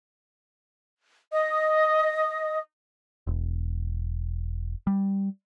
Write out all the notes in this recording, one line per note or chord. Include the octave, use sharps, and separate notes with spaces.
D#5 D#6
E1
G3